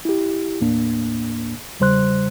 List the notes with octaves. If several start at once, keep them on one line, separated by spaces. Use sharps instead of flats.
E4 G4
D#2 A2 A#3 D4
E2 C#3 G3 C5 C6 F#6